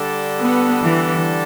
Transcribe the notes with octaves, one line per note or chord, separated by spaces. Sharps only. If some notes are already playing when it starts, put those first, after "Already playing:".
Already playing: D3 G3 D4 A4
B3
E3